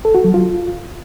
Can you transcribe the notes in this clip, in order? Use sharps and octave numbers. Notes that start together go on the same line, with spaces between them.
A4
F#4
F#3
F4